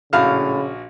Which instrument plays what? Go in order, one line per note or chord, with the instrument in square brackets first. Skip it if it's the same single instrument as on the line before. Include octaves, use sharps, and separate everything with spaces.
[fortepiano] A#1 F#4 F6 [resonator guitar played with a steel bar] A2 F5 [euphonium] C#3